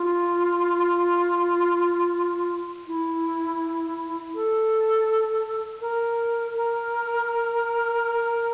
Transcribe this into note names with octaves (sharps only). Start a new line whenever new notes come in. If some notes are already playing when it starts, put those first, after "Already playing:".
Already playing: F4
E4
A4
A#4
A#4